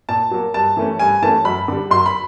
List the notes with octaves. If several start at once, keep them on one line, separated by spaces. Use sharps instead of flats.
A#2 A5
F#3 A#3
G2 A5
E3 A3 C#4
G2 G#5
E3 A3 C#4 A5
F#2 B5
D3 G3
F#2 C6
B5